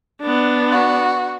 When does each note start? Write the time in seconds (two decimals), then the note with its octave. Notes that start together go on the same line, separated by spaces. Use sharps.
0.22 B3 D4
0.72 F#4